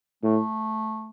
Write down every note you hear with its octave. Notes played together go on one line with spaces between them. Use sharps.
A2 A3